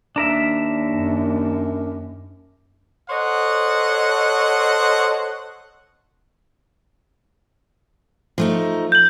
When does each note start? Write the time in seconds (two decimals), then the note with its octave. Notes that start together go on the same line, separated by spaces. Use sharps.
0.16 D#2 D4 A#4 E5
0.91 F#2
3.10 A4 C5 C#5 D#5 F#5
8.38 F3 A3 D#4
8.92 G6 F#7